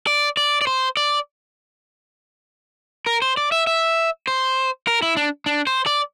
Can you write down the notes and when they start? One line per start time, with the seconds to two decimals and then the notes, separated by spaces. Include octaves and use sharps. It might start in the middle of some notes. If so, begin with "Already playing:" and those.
0.07 D5
0.37 D5
0.61 D5
0.67 C5
0.97 D5
3.06 A#4
3.22 C5
3.37 D5
3.52 E5
3.67 E5
4.27 C5
4.87 A#4
5.02 E4
5.17 D4
5.46 D4
5.67 C5
5.86 D5